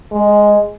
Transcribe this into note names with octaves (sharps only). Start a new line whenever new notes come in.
G#3